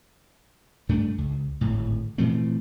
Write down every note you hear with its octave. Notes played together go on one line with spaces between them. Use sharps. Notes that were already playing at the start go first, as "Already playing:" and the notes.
G2 A3 D4
C#2
D1 G#1 A2
A#2 E3 A3 C4